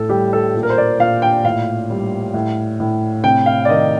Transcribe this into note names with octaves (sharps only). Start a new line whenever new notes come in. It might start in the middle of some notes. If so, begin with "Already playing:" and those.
Already playing: A2 A4
G3 G4
A4
A#2
A#4
C5
D5
A#2 F5
G5
A2 F5
G3
A2
A2
C3 G5
F5
D5
D#3 D#5